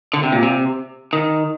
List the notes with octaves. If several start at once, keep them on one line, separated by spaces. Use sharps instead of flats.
D3
C3
A#2
C3
D#3